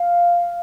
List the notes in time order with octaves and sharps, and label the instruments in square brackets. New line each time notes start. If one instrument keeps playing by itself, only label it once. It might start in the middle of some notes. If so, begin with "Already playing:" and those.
Already playing: [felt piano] F5